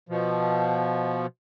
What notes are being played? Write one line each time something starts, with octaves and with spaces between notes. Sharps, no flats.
B2 F3